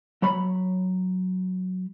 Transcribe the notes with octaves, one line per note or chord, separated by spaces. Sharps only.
F#3 C#5 B5